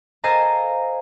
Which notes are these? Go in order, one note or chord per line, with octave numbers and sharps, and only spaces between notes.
A4 C5 D#5 F5 G#5 A#5